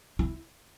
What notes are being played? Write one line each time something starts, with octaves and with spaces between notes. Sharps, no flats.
E4